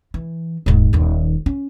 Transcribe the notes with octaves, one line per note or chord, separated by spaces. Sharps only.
E3
D#1 G#2
D#1 D#3
C#4